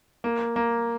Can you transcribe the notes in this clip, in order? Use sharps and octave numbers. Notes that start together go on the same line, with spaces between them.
A#3
A#3